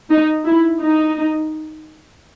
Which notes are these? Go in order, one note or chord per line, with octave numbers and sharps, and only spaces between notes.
D#4
E4
D#4